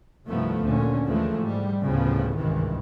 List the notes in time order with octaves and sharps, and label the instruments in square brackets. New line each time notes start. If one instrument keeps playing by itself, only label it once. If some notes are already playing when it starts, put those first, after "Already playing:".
[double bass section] C2 G2 D#3 F3 A3 B3
D2 A#2 D3 C#4
D#2 E3 F3 G#3 A3
G#2 G3
D2 A2 C#3 F3 G3 B3
G#1 C#2 G2 C3 D#3 E3